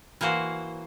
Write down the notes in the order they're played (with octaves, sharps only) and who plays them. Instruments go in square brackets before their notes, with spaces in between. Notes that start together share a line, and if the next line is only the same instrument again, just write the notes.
[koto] E3 A#3 F#4 C5